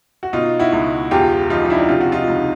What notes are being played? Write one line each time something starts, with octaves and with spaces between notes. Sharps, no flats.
F#4
B2 D#4 F4
E4 F#4
C#2
E2 F4 G4
F3 D#4 F4
D#4
D4 E4
C3 F4
F#4
D#4 F4
C#2